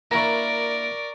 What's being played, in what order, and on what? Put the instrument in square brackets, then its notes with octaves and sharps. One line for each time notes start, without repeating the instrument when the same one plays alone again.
[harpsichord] A#3 D4 E4 [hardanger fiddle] A#4 D5 [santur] A#5 C#6